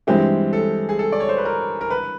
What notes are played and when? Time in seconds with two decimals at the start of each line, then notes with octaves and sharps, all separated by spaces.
0.07 G2 E3 G#3 C4 E4 G4
0.53 A4
0.89 G#4
0.99 A4
1.12 D5
1.20 C#5
1.29 C5
1.37 B4
1.45 A#4
1.81 A#4
1.90 B4